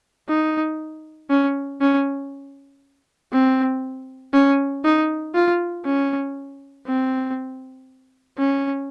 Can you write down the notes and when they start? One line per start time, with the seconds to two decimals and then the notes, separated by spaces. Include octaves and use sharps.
0.29 D#4
1.30 C#4
1.81 C#4
3.32 C4
4.33 C#4
4.85 D#4
5.35 F4
5.85 C#4
6.86 C4
8.38 C#4